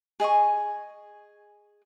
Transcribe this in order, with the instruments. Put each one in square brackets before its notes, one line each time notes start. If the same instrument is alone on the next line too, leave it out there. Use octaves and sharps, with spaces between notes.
[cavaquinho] G#4 D#5 G#5 C#6